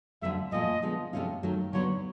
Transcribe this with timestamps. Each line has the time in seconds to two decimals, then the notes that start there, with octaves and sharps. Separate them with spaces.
0.22 F2 D3 F#3 A3 E5
0.52 A#2 F3 A3 D#5
0.82 D3 F3 G#3 B3
1.13 C3 F3 A3 C#4 F4
1.43 D#3 F#3 A3
1.73 D3 F#3 B3 C#5